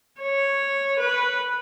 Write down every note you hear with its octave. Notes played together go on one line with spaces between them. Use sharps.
C#5
B4